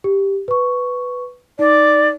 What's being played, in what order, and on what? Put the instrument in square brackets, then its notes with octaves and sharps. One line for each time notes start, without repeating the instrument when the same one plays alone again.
[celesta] G4
B4 C#6
[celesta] D#4 [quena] D5